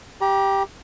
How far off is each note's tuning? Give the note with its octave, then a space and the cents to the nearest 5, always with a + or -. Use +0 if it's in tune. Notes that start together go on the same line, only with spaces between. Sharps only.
G4 +0 A#5 +40